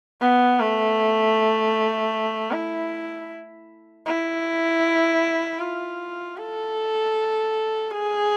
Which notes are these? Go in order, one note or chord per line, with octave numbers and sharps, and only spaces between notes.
B3
A3
E4
E4
F4
A4
G#4